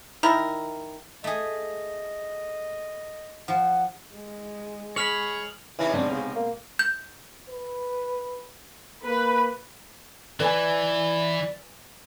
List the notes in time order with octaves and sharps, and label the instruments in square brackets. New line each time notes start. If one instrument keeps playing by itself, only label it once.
[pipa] D#3 E4 A#4
[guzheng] A3 G#4 [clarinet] D#5
[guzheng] F3 [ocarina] F#5
[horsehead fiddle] G#3
[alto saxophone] G#4 [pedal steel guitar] C#5 B5 [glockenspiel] F6 F7 F#7
[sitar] C3 C#4 D#4 [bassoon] E3
[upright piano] B2 G#3 C4 [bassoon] D4
[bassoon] C#3
A#3
[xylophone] G6
[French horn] B4
[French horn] A#3 [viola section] B4
[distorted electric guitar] E3 [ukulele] B4 C#5 G#5 [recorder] D5